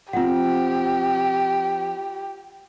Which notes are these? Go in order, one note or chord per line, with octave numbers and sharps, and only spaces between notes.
F3 C4 F4 G4 F#5